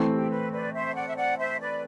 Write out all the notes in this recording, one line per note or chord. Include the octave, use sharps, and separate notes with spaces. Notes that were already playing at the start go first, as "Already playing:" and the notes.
Already playing: E3 A3 C4
G4
B4
B4 D5
C5 E5
D5 F#5
E5
D5 F#5
C5 E5
B4 D5